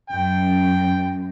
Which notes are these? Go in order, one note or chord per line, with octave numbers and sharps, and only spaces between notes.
F#2 G5